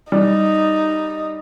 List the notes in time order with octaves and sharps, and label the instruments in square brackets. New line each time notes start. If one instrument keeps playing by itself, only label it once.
[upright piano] G3 [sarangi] D#4